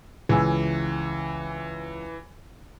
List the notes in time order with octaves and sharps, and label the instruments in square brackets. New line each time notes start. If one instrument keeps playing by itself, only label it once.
[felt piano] C#2 G#5 E6 [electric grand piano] E3